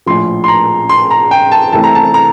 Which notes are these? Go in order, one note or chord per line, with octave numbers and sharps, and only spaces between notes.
A#1 A2 F3 C6
C6
A#5
C6
A#5
G5
A5
C2 C3 E3 A3 C4 A5
A#5
A5
A#5